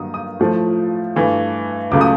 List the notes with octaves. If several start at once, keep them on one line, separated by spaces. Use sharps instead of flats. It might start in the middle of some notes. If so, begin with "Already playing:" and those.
Already playing: G2 D#3 F#3 A#3 D#6
D#6
A2 F3 A3
G2 E3 A3
C#2 C#3 F#3 A3 D6
D#6